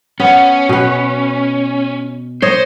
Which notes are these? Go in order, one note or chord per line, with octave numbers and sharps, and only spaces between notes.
B3 C#4
B2 B4
C5 C#5 D#5